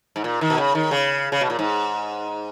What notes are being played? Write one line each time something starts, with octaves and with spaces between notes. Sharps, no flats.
G#2
A#2
D#3
B2
C#3
D#3
C#3
C#3
B2
A#2
G#2